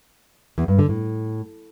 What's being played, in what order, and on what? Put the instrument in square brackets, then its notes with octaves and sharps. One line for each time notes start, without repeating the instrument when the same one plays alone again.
[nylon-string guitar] E2
G2
D3
A2